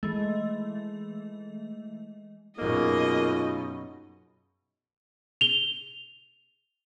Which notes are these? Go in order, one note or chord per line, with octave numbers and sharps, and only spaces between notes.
E3 G#3 A3
F#2 B2 A#3 D#4 F4 G#4 D#5
F7 G7